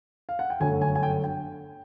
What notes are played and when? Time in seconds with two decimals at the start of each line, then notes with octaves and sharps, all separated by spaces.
0.29 F5
0.39 F#5
0.50 G5
0.60 G1 F#2 D3 F#3 A3 G#5
0.81 G#5
0.95 G#5
1.03 G5
1.24 G5